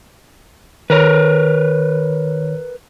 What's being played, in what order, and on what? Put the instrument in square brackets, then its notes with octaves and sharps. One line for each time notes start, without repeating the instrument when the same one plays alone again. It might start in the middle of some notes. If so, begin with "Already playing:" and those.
[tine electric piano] D#3 C#5 [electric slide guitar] A#4 B4